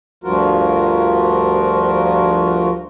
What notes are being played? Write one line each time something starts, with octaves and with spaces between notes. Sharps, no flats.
D2 G2 F3 F4 F#4 A#4